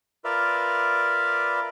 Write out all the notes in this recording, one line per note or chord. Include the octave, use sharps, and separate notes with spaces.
F4 A#4 B4 D5 E5